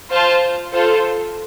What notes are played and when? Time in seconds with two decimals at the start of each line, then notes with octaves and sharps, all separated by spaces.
0.10 F4 C5 F5 A5
0.73 F4 A4 C5